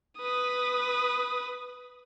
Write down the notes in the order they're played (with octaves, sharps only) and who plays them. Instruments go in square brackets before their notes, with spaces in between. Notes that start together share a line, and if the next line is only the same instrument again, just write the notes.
[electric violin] B4 D#6